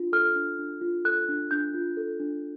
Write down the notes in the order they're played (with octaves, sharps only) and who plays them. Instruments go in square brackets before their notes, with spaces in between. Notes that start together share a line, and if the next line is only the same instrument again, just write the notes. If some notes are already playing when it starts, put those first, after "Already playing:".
Already playing: [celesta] D4 F4
A4 F6
D4
D4
F4
A4 F#6
D4
D4 G6
F4
A4
D4